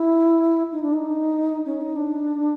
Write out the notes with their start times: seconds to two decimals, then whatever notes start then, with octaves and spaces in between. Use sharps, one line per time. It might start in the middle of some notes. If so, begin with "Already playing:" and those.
Already playing: E4
0.72 D#4
0.82 D4
0.93 D#4
1.66 C#4
1.81 D#4
1.96 D4